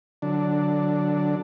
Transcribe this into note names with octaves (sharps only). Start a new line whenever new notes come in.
D3 F#3 D4